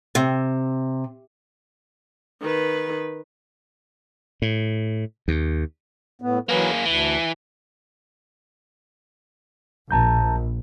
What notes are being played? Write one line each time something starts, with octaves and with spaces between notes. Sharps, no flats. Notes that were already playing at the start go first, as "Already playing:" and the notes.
C3
D#3 B4
A2
D#2
A2 B3
E3 F#3 A#3 G#4 B4
D2 E3
A#1 A5 A#5 G6